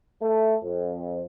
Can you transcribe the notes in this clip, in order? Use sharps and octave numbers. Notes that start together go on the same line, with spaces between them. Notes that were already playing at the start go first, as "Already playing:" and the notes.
A3
F2